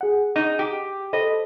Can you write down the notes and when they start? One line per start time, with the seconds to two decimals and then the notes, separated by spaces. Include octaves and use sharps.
0.01 G#4 F#5
0.36 D#4
0.59 G4
1.13 A4 C5 D#5 B5